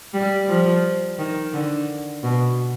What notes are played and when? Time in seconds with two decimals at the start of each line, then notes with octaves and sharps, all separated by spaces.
0.14 G3
0.48 F3
1.18 D#3
1.54 D3
2.23 B2